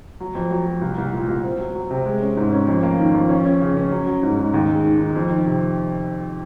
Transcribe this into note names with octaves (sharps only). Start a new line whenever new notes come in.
F#3
F2
F#3
F#3
C2
C2
A#2
C2
C4
F#3
F#3
C3
G#3
C#4
G#2
C#4
F2
A#3
D#3
F2
C#4
C#4
C#3
C#4
F#3
F#3
G#2
G#2
D#2
G#3
D#3
D#3
F2
D#3
C3